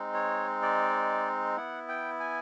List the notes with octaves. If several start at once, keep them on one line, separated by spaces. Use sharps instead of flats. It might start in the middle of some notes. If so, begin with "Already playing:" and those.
Already playing: G#3 C4 D#4
C#5
D5
B3 E4 F#5
G5
G#5